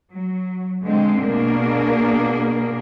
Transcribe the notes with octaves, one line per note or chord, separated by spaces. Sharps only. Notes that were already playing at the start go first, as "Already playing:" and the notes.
F#3
D3 G#3 C4
B2 A#3 D4 G#4 A#4